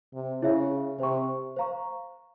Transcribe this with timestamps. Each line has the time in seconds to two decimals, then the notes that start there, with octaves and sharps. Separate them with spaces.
0.14 C3
0.42 C#3 E4 G#4 C#5 E5
0.99 C3 C5 G5 C#6
1.56 C5 F5 A#5 C#6